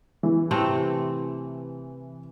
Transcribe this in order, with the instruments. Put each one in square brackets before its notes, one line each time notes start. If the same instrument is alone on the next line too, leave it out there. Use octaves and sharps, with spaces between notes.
[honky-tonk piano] E3
[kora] C3 A3 C4